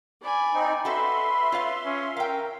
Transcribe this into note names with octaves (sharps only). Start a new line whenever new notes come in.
D5 G#5 B5
C4 D#4
F#4 A4 B4 E5 B5 C6
F4 C#5 F5
C#4
A#4 F5 G5